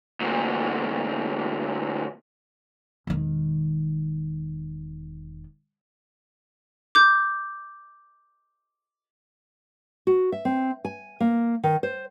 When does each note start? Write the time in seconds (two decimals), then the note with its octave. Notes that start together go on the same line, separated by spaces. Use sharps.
0.21 D2 A#2
3.07 E1 D#3
6.95 D6 G6
10.07 F#4
10.32 E5
10.45 C4
10.85 G#5
11.20 A#3
11.63 D#3
11.83 C5